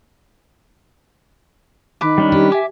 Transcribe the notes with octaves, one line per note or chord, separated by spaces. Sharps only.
D#3 B4 D6
G3 C#4 D4
G4
E5 G#5 D6